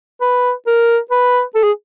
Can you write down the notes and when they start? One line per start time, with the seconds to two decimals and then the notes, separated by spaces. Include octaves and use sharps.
0.21 B4
0.67 A#4
1.11 B4
1.55 A4
1.64 G#4